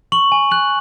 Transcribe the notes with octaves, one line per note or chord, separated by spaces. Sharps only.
C#6 F#7
G#5
F#6 F#7